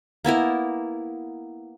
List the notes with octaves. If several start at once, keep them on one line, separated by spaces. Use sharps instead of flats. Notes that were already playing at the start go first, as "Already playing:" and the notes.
A#3 B3 E4 A#4